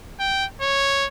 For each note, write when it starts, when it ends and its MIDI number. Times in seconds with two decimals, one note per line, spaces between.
0.19 0.45 79
0.61 1.07 73